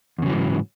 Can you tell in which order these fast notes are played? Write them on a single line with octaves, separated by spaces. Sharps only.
E2 C#3 F#3 E3 G#2